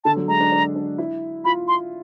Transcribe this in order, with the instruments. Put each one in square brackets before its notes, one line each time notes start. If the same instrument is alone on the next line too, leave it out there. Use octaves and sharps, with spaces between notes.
[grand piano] D3 [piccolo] A5
[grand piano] F#3
[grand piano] G#3 [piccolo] A#5
[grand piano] D4
D4
D4
E4
[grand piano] F4 [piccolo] B5
[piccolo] C6